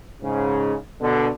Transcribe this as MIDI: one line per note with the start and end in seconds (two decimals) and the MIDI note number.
0.23 0.75 44
0.23 0.75 49
1.01 1.29 47
1.01 1.29 50